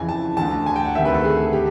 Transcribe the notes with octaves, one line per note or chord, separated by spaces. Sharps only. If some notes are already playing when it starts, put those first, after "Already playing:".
Already playing: F2 C#3 E3 G#5
A5
D2 D3 A5
G#5
G5
F#5
D2 C3 D#3 E5
B4
A4
G#4
G4